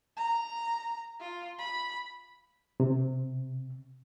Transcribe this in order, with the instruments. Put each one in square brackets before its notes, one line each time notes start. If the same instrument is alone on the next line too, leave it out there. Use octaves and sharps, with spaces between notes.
[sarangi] A#5
F4
B5
[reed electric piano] C3